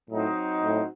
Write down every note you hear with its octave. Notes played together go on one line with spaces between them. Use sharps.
A2 F#3 C4 D#4 F#4
A2